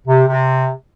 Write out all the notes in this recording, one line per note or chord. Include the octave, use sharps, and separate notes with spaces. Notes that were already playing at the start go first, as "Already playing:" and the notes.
C3
C3